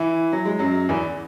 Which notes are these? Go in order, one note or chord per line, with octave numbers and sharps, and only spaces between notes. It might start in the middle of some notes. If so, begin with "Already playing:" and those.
Already playing: E3 E4
F#3
G#3
F#2 F#3
E2 E3